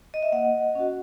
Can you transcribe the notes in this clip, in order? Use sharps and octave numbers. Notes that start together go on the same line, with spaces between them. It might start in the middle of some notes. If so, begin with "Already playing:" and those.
D#5
E5
A#3 D#5 F#5
C#4 F#4